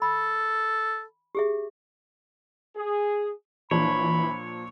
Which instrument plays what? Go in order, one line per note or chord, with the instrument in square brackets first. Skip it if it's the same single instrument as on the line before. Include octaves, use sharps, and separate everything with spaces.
[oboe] A4 [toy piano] B5
[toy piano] G4 G#4 E5
[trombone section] G#4
[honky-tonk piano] A#2 F3 D4 [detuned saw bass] E3 [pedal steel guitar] C#5 [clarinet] B5